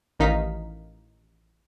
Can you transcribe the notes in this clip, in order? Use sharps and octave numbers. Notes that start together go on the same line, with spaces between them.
A1 D#3 D#4 F5 B6